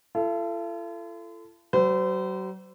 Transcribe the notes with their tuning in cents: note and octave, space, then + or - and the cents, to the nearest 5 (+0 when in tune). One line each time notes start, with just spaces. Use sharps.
F4 -45 A4 +0
F#3 +40 C5 -35